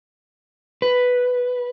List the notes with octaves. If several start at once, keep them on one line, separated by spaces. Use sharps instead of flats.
B4